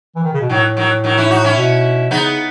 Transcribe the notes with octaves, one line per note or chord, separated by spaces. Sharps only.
E3
D#3
C#3
B2
A2 D#3 F#3
D#3 F#3
D#3 F#3
C#4 E4
D#4 F#4
C#4 E4
B2
C#3 B3 D#4